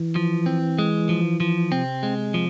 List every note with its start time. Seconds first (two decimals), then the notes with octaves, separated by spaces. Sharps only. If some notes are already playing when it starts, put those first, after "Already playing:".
Already playing: E3
0.16 F3
0.46 C4
0.79 G#3
1.09 F3
1.40 F3
1.72 C3 C4
2.03 G#3
2.34 F3